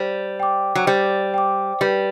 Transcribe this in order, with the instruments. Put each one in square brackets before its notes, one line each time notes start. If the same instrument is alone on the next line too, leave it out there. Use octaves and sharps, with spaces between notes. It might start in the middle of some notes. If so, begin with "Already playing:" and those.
Already playing: [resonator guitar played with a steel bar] G3 [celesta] C5
[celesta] G5 D6
[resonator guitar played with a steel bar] F#3
[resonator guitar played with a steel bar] G3 [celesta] C5
[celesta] G5 D6
[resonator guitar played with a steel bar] G3 [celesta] B4